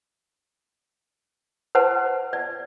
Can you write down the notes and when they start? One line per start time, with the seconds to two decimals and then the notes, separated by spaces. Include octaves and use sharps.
1.75 B4 C5 F#5 A5
2.33 D5